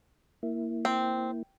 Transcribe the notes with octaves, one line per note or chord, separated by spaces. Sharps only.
A#3 E4
C4